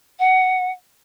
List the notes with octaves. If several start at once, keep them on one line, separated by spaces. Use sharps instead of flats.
F#5